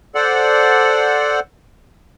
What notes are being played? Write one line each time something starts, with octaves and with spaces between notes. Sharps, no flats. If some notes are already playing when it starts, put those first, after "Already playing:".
A4 C5 D5 F#5